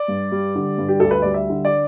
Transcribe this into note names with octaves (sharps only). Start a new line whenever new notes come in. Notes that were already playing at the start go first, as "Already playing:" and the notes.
Already playing: D5
G2
G3
D3
G2
G4
D2 A4
B4
G3 D5
E5
D3
D5